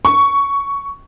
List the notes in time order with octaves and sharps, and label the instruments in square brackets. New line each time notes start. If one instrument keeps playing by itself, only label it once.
[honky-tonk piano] C#6